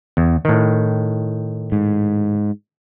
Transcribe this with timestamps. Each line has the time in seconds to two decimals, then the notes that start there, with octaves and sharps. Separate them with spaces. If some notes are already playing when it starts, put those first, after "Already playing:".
0.17 E2
0.45 A2 D#3
1.72 G#2